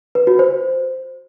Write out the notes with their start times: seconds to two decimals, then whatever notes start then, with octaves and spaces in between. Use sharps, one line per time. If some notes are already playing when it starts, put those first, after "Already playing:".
0.15 B4
0.27 F#4
0.39 C5